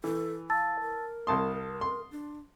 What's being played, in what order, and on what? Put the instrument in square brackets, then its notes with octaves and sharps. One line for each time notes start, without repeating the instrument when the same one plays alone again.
[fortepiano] E3 [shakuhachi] A4
[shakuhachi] F5 [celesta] A5 E6 A6
[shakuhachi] A#4
[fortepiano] C2 A5 C6 [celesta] D#6
[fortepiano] C6
[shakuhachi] D4